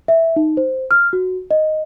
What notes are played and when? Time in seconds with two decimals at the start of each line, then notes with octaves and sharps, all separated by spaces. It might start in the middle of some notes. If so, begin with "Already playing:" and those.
0.08 E5
0.36 D#4
0.57 C5
0.91 F6
1.13 F#4
1.51 D#5